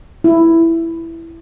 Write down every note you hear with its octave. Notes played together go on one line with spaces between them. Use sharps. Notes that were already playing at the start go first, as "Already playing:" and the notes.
E4